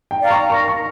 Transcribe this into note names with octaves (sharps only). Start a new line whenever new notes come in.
G5
D5 F5 A#5
C#6
A#4 C#6
C#6